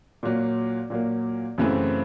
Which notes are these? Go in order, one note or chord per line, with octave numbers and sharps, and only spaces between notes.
A#2 F#3 A#3
A#2 F#3 A#3
F#2 C#3 E3 A3 C4